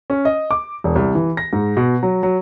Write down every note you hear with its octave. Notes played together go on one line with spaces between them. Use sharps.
C#4
D#5
D6
E1
C2
E3
A#6
G#2
B2
F#3
F#3